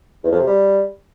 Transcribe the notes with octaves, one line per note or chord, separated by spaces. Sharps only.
E2
F2
C3
G3